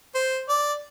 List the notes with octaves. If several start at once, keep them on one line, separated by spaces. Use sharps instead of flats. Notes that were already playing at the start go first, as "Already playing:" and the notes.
C5
D5